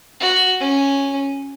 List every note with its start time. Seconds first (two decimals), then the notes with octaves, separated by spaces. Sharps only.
0.20 F#4
0.60 C#4